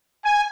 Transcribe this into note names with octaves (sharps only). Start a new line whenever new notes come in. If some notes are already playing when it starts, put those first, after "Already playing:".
G#5